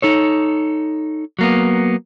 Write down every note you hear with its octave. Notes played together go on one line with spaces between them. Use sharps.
D#4 A4 C#5
F#3 A#3 B3